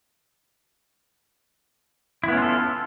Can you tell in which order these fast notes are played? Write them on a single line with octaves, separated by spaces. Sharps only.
E4 B3 C#4 F4 A4